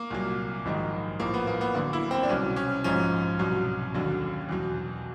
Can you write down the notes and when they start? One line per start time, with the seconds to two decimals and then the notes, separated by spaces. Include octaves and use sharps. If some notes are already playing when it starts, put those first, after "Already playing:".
Already playing: A#3
0.11 C2 A#2 F#3
0.65 A#1 G#2 D#3 F#3
1.20 A#1 A2 F3 A#3
1.34 B3
1.47 A#3
1.61 B3
1.75 D2 D3 F#3 A#3
1.93 E4
2.11 C4
2.23 D4
2.29 C2 B2 F#3 C#4
2.56 C#4
2.84 A#1 G#2 F3 C#4
3.39 C2 B2 F#3
3.94 D#2 D3 F#3
4.49 E2 B2 F#3